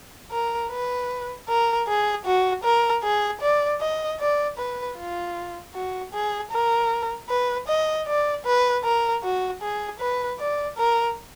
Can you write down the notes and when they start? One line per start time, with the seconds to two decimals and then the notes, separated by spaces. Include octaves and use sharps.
0.32 A#4
0.71 B4
1.49 A#4
1.88 G#4
2.26 F#4
2.64 A#4
3.04 G#4
3.41 D5
3.81 D#5
4.20 D5
4.58 B4
4.97 F4
5.75 F#4
6.13 G#4
6.52 A#4
7.30 B4
7.68 D#5
8.07 D5
8.45 B4
8.84 A#4
9.23 F#4
9.62 G#4
10.00 B4
10.40 D5
10.77 A#4